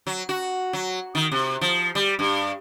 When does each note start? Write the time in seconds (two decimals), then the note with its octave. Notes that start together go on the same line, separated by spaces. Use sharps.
0.07 F#3
0.29 F#4
0.73 F#3
1.15 D#3
1.32 C3
1.61 F3
1.95 G3
2.19 G2